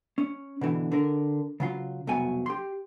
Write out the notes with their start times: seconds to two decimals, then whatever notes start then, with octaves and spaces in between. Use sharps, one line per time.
0.18 C#4
0.61 B2 D3 E3
0.92 D3 A#4
1.60 C#3 F#3 F4
2.07 C2 F2 B2 F#3 G#5
2.46 G4 C6